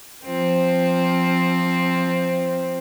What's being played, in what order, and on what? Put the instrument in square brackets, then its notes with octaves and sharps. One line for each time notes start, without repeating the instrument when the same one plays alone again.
[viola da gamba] F3 C4